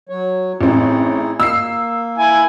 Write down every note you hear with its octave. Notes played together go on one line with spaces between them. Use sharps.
F#3 C#5
A1 C4 D#4 E4 G#4
A#3 E6 C7
E4 G#5